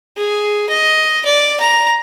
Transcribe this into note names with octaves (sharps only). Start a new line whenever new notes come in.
G#4
D#5
D5
A#5